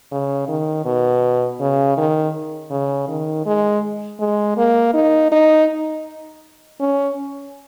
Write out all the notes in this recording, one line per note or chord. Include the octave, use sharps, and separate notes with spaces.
C#3
D#3
B2
C#3
D#3
C#3
D#3
G#3
G#3
A#3
D#4
D#4
C#4